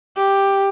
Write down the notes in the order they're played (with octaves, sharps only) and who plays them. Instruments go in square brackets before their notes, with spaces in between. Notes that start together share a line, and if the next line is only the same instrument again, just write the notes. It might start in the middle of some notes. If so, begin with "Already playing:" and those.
[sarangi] G4